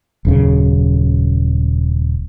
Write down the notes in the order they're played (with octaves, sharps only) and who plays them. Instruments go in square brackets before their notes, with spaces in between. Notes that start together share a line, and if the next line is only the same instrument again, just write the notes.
[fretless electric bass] D#1 F#2 C#3